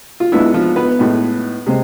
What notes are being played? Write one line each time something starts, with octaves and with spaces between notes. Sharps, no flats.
F4
G#2 G#3 B3 D4 E4
F3 F4
B3 B4
A2 G#3 B3
C3 G#3 C4